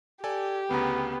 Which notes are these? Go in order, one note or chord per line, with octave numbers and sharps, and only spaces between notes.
G4 A4 D5 G#5
D2 C#3 B3 A#5